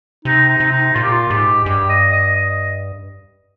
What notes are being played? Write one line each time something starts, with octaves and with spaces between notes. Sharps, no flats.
C3 D#4
D#4
C3
D#4
A#2 F4
G4
F4
G#2 G4
G2 G4
D#5
D#5
D#5